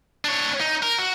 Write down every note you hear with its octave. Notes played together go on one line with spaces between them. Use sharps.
D4 C#5
D#4
A#4
F#4